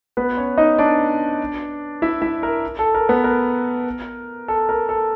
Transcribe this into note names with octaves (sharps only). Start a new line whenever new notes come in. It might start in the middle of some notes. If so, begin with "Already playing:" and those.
B3 B4
C#4 C#5
D#4 D#5
D4 D5
E4 E5
E4 E5
A#4
A4
A#4
B3 B4
A#4
A4
A#4
A4